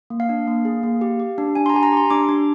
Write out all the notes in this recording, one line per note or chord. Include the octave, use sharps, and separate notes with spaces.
A#3
F5
D4
A#3
G#4
A#3
G4
G4
D4
D4 G#5
C6
A#5
G4 G#5
A#5
G4 C6
D4 D6
D4